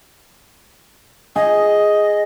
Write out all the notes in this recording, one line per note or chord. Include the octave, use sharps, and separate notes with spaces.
G#4 D#5